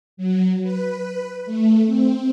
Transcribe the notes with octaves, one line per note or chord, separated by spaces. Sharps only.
F#3
B4
A3
C4